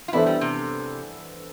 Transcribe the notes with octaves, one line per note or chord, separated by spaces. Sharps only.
F4
E3 B3 D4 E4 A4 C5
G3
C3